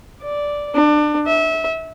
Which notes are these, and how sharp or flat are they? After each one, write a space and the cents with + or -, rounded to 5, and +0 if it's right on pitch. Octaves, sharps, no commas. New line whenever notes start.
D5 -5
D4 +25
E5 -25